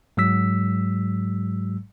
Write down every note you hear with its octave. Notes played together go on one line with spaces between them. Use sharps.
G#2 F#3 G#3 E6 B6